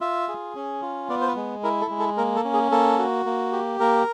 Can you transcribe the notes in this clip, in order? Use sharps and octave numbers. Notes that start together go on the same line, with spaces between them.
F4 E5
G#4
C#4
F4
B3 D5
C5
B4
G#3
E4 A#4
A4
G#3
A4
A#3 A#4
A4
C#4
G#4
A#3 A4
F#4
A#3
G4
A#3 A#4